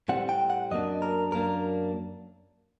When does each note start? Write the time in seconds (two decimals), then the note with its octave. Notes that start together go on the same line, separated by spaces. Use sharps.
0.08 A2 G3 C4 F#5
0.29 G5
0.50 F#5
0.71 F#2 F#3 A#3 D4 D#5
1.02 A#4
1.32 F#2 F#3 A#3 D4 A#4